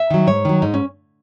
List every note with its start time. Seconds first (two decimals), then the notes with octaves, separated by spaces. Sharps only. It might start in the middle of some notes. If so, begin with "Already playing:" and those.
Already playing: E5
0.10 D#3 F#3
0.27 G#2 C#5
0.45 D#3 F#3
0.62 G#2 D#4
0.74 C#4